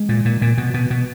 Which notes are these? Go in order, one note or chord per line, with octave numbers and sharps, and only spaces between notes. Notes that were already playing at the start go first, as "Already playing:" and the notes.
Already playing: G#3
A#2
A#2
A#2
B2
B2
B2